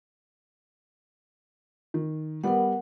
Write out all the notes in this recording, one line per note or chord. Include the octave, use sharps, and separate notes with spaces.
D#3
G3 B3 A#4 F#5